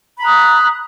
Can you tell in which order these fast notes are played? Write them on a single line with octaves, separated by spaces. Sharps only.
B5 A#5 F#6 D#6